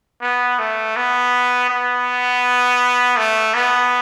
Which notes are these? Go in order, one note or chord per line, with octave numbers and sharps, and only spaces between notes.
B3
A3
B3
B3
A3
B3